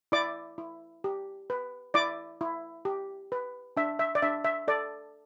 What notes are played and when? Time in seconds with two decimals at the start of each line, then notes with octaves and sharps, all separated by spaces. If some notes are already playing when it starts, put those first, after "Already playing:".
0.12 E4 D5 D6
0.58 E4
1.04 G4
1.50 B4
1.94 E4 D5 D6
2.41 E4
2.85 G4
3.32 B4
3.77 D4 E5
3.99 E5
4.15 D5
4.22 D4 E5
4.44 E5
4.68 A4 D5